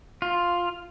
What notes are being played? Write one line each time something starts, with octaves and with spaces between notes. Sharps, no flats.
F4